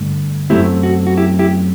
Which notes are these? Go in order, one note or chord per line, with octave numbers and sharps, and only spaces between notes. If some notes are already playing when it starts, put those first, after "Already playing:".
Already playing: G2 D3 A3
F#2 F#3 A3 C4 E4 G4
F#4
F#4
E4 G4
E4 G4